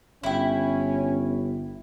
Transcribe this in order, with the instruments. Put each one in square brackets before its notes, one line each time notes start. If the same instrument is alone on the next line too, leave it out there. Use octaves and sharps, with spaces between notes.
[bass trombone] G1 [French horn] C#4 [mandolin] E4 G5